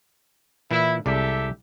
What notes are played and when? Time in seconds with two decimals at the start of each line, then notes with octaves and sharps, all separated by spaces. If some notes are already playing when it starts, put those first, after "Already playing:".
0.71 A#2 E3 E4
1.06 C2 G#3 G4 A4 D5 E5